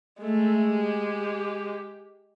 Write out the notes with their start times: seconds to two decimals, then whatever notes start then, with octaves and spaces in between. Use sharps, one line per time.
0.21 G#3 A3
0.69 G4